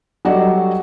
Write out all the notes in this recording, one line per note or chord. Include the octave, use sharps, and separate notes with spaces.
F#3 G3 F#4 A4 D5 D#5